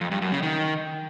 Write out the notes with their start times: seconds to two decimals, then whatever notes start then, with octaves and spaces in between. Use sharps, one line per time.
0.01 F2
0.11 G2
0.22 F#2
0.32 C#3
0.43 D#3